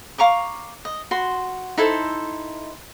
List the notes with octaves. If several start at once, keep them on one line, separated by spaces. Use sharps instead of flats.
F5 A#5 C#6 D6
D#5
F#4 C6
D#4 E4 A4 C5